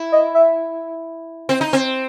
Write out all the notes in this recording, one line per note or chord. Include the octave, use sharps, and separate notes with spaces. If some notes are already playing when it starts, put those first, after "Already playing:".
Already playing: E4
D#5
E5
C4
D#4
C4